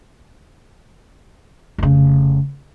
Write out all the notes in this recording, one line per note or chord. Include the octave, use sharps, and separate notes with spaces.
F1 C#3